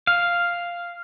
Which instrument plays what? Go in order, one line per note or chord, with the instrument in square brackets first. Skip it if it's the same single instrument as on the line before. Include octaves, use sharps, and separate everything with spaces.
[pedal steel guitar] F5